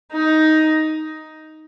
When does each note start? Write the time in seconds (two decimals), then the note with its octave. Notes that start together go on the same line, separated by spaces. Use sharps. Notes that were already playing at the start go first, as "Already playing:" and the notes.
0.12 D#4